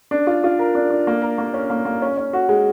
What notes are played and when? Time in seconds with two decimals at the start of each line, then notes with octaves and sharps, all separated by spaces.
0.11 D4
0.27 F4
0.44 F4
0.59 A#4
0.75 D4
0.90 D4
1.07 A#3
1.22 A#4
1.38 A#3
1.54 C#4
1.70 A#3
1.85 A#3
2.02 C#4
2.17 C#4
2.33 F#4
2.49 G#3